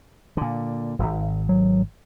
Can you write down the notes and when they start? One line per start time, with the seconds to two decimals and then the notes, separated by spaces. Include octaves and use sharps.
0.37 A#2 D3
0.99 D#1 G#1
1.49 F#3